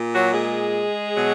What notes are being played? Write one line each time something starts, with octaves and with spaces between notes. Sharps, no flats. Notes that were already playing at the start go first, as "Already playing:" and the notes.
Already playing: A#2
F#3 F#4
G#3 G#4
B2 F#3